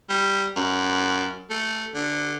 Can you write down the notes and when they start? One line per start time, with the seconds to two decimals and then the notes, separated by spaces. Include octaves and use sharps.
0.10 G3
0.56 F#2
1.50 A3
1.95 D3